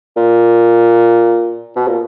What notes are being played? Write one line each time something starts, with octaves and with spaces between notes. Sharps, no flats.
A#2
B2
A#2